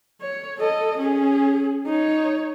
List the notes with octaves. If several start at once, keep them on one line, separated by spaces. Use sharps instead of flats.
C#5
A4 D#5
C#4 G#4
D#4 C#5